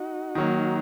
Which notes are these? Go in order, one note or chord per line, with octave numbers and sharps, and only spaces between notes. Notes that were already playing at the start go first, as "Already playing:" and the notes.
Already playing: D#4 F#4
D#3 F#3 A#3